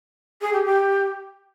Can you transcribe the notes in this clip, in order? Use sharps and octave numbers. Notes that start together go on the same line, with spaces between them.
G#4
G4
G4